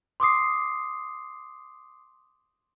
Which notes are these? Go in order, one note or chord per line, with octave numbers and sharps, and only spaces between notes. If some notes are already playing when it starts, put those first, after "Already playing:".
C6 D6 D#6 C7